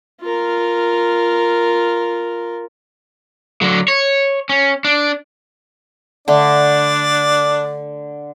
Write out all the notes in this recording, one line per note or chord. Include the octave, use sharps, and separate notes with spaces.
F4 A#4
D3 F#3
C#5
C#4
D4
D3 A3 D4 D5